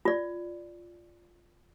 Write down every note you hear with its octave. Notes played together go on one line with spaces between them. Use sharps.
F4 D5